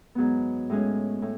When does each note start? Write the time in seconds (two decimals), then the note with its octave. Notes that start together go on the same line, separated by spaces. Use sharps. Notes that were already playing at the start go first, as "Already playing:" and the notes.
0.15 G#2 F#3 B3
0.70 A2 G#3 C#4
1.22 A2